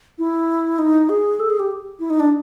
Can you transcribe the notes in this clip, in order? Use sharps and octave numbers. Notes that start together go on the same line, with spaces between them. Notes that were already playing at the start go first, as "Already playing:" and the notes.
E4
D#4
G#4
A4
G#4
G4
E4
D#4
D4